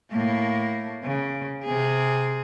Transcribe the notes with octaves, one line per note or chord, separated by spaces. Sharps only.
A2 A#3
C#3
C3 G#4